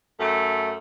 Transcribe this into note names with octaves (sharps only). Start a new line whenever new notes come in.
F#2 A3